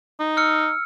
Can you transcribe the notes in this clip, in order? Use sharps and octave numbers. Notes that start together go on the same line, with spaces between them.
D#4
E6 F6 C#7